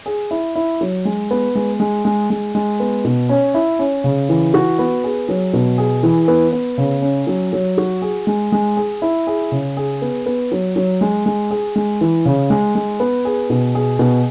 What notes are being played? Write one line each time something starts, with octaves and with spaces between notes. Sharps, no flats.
G#4
E4
E4
F#3
G#3
B3
G#3
G#3
G#3
G#3
G#3
B3
B2
C#4
E4
C#4
C#3
E3
F#4
B3
G#4
F#3
B2
G#4
E3
B3
B3
C#3
C#4
F#3
F#3
F#4
G#4
G#3
G#3
G#4
E4
G#4
C#3
G#4
B3
B3
F#3
F#3
G#3
G#3
G#4
G#3
E3
C#3
G#3
G#3
B3
G#4
B2
G#4
B2